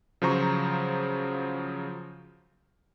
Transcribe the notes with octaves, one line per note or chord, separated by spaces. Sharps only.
C#3 F3 F#3 C5 A#5 C#6